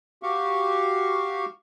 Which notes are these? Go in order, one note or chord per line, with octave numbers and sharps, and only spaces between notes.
F#4 G4 F5 C#6